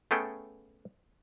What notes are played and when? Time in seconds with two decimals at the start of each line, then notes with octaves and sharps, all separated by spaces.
0.11 A3 B3 C#4 G#4 A4 G5